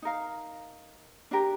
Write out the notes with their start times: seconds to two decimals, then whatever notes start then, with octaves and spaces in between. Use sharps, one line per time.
0.02 D#4 A#4 F5
1.31 D4 G4 A#4